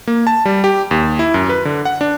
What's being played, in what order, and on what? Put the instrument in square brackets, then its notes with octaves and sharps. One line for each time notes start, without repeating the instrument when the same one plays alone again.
[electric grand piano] A#3
A5
G3
G4
D#2
E4
F#2
B4
D3
F#5
D4